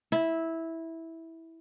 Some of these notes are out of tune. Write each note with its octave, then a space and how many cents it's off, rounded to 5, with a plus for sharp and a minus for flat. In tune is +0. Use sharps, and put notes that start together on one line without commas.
E4 -10